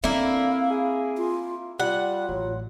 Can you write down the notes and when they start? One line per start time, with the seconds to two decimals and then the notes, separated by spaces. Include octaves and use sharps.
0.04 D3 A#3 C4 E4 F5
0.71 G#4
1.17 F4
1.80 G3 F4 F#5
2.29 A1 F#3